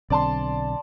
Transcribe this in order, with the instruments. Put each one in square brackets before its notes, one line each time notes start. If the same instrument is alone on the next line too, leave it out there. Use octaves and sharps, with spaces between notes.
[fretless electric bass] B1 D3 C4 [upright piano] D5 A5 C6